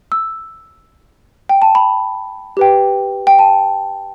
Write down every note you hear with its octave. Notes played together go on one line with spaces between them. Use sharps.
E6
G5
A5
B5
G4 B4 G5
G5
A5